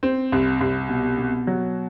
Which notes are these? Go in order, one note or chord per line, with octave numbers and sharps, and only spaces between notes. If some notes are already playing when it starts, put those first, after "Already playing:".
C4
C2
C2
B2
B2
F#3